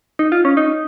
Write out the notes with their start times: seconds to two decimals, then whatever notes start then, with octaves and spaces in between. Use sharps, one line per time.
0.19 D#4
0.32 F4
0.45 C#4
0.57 D#4